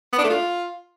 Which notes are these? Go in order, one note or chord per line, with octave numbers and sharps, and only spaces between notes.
B3
D4
A3
F4